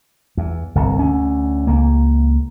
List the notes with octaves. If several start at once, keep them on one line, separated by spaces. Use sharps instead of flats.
E2
G1 C2
D2 C#4
C#2 A#3